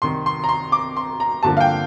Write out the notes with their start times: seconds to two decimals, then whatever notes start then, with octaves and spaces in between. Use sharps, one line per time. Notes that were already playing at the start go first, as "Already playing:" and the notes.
0.02 C2 C3 D#3 C6
0.26 C6
0.44 A#5
0.49 C6
0.72 D6
0.96 C6
1.20 A#5
1.43 G2 D3 F3 A#3 A5
1.57 F5
1.60 G5